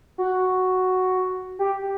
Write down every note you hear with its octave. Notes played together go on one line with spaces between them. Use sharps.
F#4
G4